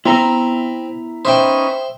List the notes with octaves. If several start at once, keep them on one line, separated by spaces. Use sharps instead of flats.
B3 C4 E4 A#5
C#4 D#4 B4 C5 E5 G5